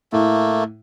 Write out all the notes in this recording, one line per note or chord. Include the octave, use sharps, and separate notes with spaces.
A2 A3 A#3